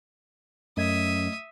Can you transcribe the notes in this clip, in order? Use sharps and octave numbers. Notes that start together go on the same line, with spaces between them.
F#2 A3 D#5 E5 D#6 G#6